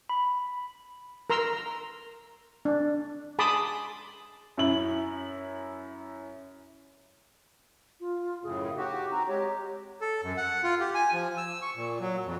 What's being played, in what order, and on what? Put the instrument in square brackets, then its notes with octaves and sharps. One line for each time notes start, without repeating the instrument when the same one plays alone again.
[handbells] B5
[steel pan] A#4 A#5 C6 E6
D4
G#4 A5 B5 C6 D6 D#6
[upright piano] F#2 E4 F#7
[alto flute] F4
[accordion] F#2 A2 C#3 [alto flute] G#4
[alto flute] D#4 [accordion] F#4 G4
[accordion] C4 F#4 [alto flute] A#5
[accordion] G#3 G4 [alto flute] C#5
[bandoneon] A4
F#2
F#5
F4
G4
G#5
F3
E6
C#6
A#2
F#3
F2